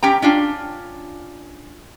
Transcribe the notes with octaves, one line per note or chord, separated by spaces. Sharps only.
C#4 G4 G5 A#5
C#4 D4 F4